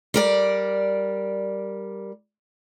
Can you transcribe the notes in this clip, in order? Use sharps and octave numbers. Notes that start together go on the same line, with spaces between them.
G3 A#4 D5